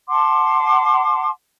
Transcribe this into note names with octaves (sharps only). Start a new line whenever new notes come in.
F#5 A5 C6 D6